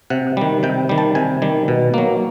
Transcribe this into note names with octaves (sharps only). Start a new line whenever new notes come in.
C3 F#5
D#3 G3
C3 G5
D#3 G3
A5
C3 G#5
D#3 G3
B2
F#3 A#3